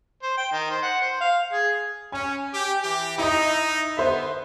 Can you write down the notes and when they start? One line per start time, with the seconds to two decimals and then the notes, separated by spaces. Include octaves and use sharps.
0.23 C5
0.38 G5
0.52 D#3
0.71 C5
0.83 F#5
1.02 C5
1.21 F5
1.52 G#4
2.12 C#4 G#5
2.53 G4
2.83 E3 G4
3.18 D#4 E4 D#5
3.97 D3 B3 C5 E5